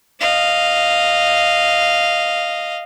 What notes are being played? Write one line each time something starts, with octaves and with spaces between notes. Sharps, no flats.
D#5 F5